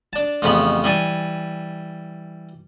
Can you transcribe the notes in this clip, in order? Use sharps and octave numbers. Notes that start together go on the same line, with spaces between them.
D4 A5
A1 F2 C#3 B3 B5
E3 G3 G#5 A5